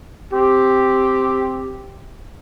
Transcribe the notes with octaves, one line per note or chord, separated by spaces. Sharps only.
C4 G4